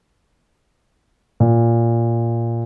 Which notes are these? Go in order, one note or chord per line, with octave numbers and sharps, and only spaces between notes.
A#2